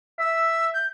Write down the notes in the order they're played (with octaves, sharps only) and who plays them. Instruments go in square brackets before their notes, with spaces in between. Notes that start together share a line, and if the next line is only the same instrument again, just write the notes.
[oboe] E5 [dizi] E6
[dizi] G6